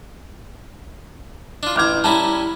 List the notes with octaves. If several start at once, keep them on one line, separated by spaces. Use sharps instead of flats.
D4 F4
A1 A#5 D6 F6 G#6
G3 C#4 E4 A5 A#5